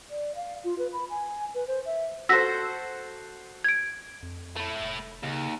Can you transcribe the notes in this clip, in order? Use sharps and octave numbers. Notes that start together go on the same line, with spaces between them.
D5
F5
F4
B4
B5
G#5
B4
C5
E5
F#4 A4 C5 E6 A#6 B6
G#6 D7
F2
A3 E4
F1
D#2 C#3